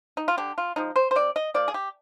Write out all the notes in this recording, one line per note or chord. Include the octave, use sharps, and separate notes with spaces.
D#4
F4
D3 G4
F4
F3 G#3 D#4
C5
C5
C3 D5
D#5
F3 A#3 D5
G#4
G4